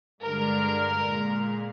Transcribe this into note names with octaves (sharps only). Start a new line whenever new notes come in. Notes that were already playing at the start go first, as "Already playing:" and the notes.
G2 D3 G#3 A#4
A#2 G#3